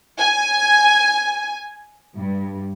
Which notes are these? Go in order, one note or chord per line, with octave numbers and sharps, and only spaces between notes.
G#5
G2